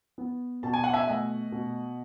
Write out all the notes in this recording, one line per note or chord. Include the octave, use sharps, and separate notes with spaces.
B3
B2 A5
G#5
F#5
E5 G#5
A3 D#5 F#5
B2